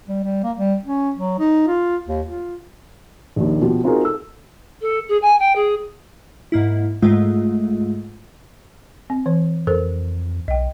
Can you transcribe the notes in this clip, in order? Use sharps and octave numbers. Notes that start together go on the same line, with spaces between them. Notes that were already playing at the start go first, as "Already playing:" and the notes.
G3
G3
A#3
G3
C#4
F#3
D#4
F4
D#2
F4
A#1 D#2
B2 F3 G4
C4 D#4 F4 F#4 G#4 A#4
A4 E6
A4
G#4
G#5
G5
G#4
G#2 A#3 E4
G#2 G#3 A3 F4
C4
E3 C#5
F2 A4 A#4 C5
B1 D#5 G5